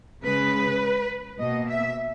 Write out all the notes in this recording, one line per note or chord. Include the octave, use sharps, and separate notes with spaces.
C#3 G#3 B4
B2 A#3 D#5
E5